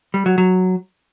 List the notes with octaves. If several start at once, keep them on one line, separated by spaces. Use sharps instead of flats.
G3
F#3
F#3